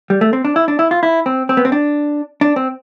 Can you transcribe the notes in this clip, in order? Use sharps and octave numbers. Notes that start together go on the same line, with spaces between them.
G3
A3
C4
D4
E4
D4
E4
F4
E4
C4
C4
B3
C4
D4
D4
C4